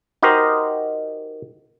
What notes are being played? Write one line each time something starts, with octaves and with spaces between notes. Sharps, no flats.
D#4 F#4 G4 A#4 C5 D#5